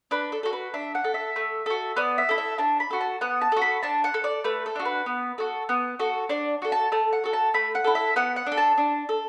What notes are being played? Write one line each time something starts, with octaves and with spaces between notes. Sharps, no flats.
D4 B4
A4
F#4 A4
B4
D4 E5
F#5
A4
E5
A3
F#4 A4
B3 D5
E5
E4 A4
E5
D4 A5
B5
F#4 A4
A5
B3 F#5
A5
F#4 A4
B5
D4 A5
F#5
A4
D5
A3 B4
A4
D4 F#4
B4
B3
F#4 A4
B3
F#4 A4
D4 D5
F#4 A4
A5
A3 A5
F#5
F#4 A4
A5
A3 B5
F#5
E4 A4
E5
B3 F#5
F#5
D4
A4
A5
D4
A4